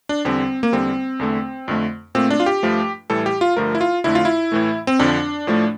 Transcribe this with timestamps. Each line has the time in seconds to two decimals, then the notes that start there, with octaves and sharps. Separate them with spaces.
0.09 D4
0.25 E2 D3 G3 C4
0.63 A#3
0.73 E2 D3 G3 C4
1.20 E2 D3 A3
1.68 F2 D3 A3
2.15 A#2 A3 C4
2.30 D4
2.40 F4
2.46 G4
2.63 G2 F3 A3
3.10 A2 E3 G3 A4
3.26 G4
3.41 F4
3.56 G2 D3 F3 A3 A#4
3.75 E4
3.81 F4
4.04 F2 D3 A3 E4
4.15 F4
4.25 E4
4.52 A2 E3 A3
4.87 C4
4.99 F2 D3 F3 D4
5.47 A2 F3 A3